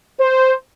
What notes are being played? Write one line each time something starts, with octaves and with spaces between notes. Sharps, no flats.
C5